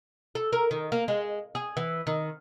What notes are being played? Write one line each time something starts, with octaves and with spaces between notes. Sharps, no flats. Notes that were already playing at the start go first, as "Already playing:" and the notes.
A4
A#4
D#3
A#3
G#3
G#4
E3
D#3